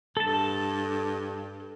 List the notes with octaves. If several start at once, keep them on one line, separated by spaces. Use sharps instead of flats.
G2 A4 A5